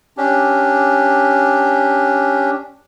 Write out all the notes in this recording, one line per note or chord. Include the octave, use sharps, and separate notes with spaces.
C#4 D4 G4